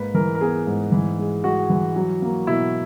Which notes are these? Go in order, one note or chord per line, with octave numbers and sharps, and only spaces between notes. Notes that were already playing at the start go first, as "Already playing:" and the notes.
Already playing: G#2 A#3 B4
E3 A#4
A#4
B3 G#4
G#2
E3
G#3
G#3 F#4
E3
F#3
A#3
B2 E4